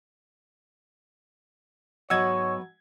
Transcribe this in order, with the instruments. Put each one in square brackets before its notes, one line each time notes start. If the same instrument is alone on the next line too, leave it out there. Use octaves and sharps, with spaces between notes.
[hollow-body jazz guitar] G#2 D#5 F#5 [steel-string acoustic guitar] F#3 B3 [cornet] C#5 [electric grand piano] E6 G#6